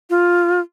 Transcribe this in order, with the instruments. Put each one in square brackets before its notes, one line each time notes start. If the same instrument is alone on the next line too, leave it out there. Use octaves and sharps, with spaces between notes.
[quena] F4